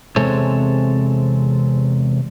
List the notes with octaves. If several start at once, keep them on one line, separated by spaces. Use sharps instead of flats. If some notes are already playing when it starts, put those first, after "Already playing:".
E2 C3 G#3 C4 A4 C#5